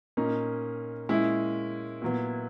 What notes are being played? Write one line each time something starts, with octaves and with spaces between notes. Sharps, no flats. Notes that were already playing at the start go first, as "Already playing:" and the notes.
A#2 A#3 C#4 D#4
A#2 G#3 C#4 E4
A#2 F#3 B3